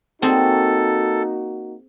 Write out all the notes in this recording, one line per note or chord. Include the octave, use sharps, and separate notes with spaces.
A#3 C4 D#4 F#4 G#4 A4